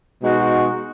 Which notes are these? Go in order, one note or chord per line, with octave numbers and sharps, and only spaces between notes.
B2 G#3 D#4 F#4